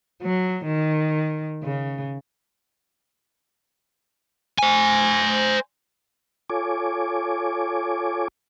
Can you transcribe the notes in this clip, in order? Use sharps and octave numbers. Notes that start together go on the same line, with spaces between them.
F#3
D#3
C#3
C5 G#5
F4 A4 C#5 G#5 D6